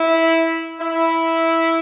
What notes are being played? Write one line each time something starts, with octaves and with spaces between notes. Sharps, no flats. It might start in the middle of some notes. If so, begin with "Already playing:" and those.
Already playing: E4
E4